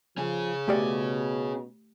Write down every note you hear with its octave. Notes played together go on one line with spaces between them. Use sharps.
F3 C#4 G#4
B2 A3 G4 D5